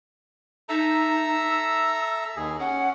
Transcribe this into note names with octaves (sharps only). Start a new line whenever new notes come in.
D#4 A4 E5 A#5
E6
D#2 G#4
C#4 F#5